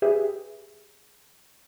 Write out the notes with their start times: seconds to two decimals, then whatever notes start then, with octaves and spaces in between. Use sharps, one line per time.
0.02 G4 G#4 B4 E5